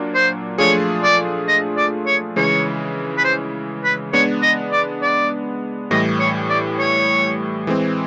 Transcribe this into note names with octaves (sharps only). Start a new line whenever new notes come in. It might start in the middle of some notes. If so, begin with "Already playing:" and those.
Already playing: A#2 F#3 A#3 D4
C5
F3 A3 D4 F4 G#4 C#5
D5
D#5
D5
C#5
C#3 E3 G#3 C#5
B4
C5
B4
G#3 B3 D4 C#5
D#5
D5
D5
A2 E3 G3 D#5
C#5
D5
C#5
E3 G#3 C4